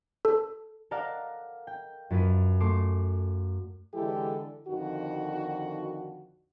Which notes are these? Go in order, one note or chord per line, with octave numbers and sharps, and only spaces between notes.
A4
A4 A#4 D5 F5 F#5
G5
F#2 F4 B4 D#7
A3 C6 D6
D3 E3 G#3 E4 G4 A4
F2 D3 D#3 F#4